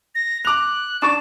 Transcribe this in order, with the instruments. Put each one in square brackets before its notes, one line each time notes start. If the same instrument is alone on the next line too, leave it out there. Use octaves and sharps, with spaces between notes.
[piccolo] A#6
[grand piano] D6 F7 [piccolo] F#6
[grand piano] D4 C#6 A6 [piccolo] E7